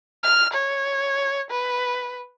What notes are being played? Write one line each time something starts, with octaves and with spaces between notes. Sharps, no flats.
F6
C#5
B4